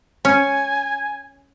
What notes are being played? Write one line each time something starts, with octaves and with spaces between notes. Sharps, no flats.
C#4 G#5